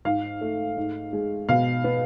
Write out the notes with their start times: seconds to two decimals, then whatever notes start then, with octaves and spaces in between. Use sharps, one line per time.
0.05 G#2 F5
0.41 A3
0.77 G#2
1.13 G#3
1.49 B2 F5
1.84 B3